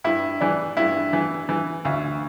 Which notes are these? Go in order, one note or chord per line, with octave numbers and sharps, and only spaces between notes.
G2 E4
E3 D4
G2 E4
E3
E3
D2